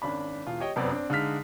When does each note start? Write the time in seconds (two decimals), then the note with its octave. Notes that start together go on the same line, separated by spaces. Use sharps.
0.02 G#1 C#4 D4 B5
0.46 E1 F4
0.60 G4 C#5 D#5 G5
0.76 F1 F#2 B3 C4 D5
0.90 C4 D4
1.10 D3 G#3 D#4 F5 F6 B6